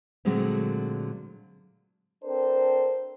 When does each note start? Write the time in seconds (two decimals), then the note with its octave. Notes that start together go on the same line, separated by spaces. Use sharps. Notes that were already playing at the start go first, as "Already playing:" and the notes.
0.25 A#2 D3 F#3 G#3 A3 C4
2.24 C4 D4 A4 A#4 C5